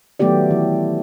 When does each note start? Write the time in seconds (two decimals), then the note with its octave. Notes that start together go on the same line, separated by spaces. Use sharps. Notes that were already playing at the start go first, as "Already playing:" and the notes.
0.19 D#3 F#3 A3 B3 G4 D5
0.51 E3